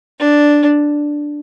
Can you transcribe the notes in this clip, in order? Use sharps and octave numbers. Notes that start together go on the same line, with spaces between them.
D4